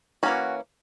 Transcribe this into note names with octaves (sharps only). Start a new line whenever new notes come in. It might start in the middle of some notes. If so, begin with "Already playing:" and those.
E3 A#3 C#4 F#4